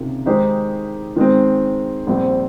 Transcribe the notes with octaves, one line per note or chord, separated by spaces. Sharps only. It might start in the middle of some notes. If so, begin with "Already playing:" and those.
Already playing: C#2 C3 D#3 A#3 F4
D#3 G#3 D#4 G4 C5
D#3 G#3 C4
A#1 A#2 G3 C4